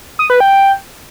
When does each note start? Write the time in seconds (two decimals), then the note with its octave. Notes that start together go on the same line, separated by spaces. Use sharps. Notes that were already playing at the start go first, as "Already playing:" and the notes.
0.19 D#6
0.30 B4
0.40 G5